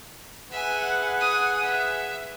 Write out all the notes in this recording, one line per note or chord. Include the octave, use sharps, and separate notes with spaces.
G#4 B4 E5 F#5 G#5
G#5 D#6
E5